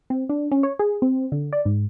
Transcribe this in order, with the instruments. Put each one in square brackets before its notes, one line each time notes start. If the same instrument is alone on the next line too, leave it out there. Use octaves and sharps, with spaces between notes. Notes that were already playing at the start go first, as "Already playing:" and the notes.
[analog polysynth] C4
D4
C#4
C#5
G#4
C4
D3
D5
G#2